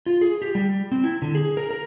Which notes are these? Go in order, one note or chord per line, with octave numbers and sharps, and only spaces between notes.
F4
G#4
G4
G3
C4
E4
D3
G#4
A#4
A#4